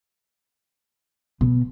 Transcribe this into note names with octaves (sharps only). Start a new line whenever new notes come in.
B2